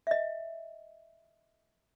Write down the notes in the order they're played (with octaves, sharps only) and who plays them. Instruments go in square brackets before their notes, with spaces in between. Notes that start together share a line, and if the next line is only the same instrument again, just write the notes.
[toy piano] D#5 E5